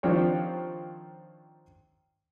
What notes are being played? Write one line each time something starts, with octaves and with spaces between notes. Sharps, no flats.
D#3 F3 C4 D4 G4 C#5